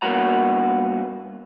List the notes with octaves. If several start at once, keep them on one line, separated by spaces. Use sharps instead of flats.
G2 A#3 B3 F#4 F#5 A#5